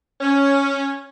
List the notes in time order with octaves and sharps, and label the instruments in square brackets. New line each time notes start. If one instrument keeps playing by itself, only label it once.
[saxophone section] C#4